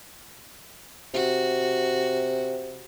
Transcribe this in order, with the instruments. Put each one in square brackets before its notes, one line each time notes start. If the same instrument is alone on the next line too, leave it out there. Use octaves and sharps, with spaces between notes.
[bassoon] C3 [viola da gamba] F#4